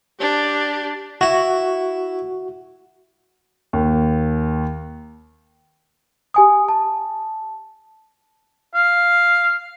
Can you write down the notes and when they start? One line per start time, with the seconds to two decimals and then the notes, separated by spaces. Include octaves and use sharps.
0.20 D4 G4
1.21 E4 F#4
3.73 D#2
6.34 G4 G#5 D#6
6.69 A5
8.75 F5